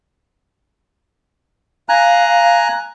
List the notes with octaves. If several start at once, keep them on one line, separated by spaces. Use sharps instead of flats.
F5 G#5 A#5 F#6